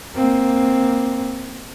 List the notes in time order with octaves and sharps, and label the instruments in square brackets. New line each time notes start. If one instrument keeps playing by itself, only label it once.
[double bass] A#3 C4